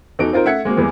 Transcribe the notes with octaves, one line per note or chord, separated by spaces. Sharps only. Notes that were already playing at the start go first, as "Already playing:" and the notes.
E2 D#4 F#4 A4 D7
C4 D#4 F4 A#4 C5
A3 E5 F#5 G#6 C#7
G#3 A#3 C4 F#4
E2 E3 G3 G#3